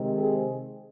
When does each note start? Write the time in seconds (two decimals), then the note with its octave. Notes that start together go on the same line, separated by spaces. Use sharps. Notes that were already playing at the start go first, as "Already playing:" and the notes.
Already playing: C3 D#3 G#3 C4
0.19 G#4